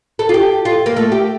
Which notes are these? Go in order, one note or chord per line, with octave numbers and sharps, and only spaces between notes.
A4
F4
G4
F4
A#3
A3
G4